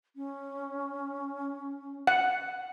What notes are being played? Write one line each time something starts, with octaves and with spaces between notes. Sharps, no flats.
C#4
F#5